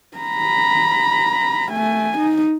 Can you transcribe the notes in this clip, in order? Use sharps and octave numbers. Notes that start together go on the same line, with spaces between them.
A#5 B5
A3 G#5
D#4